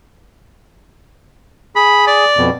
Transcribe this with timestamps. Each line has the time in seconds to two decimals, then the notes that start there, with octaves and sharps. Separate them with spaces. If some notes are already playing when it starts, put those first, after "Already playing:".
1.75 G#4 B5
2.07 D5
2.37 F2 B2